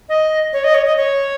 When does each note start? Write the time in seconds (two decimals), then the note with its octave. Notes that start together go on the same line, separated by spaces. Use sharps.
0.09 D#5
0.53 C#5
0.64 D#5
0.74 C#5
0.86 D#5
0.97 C#5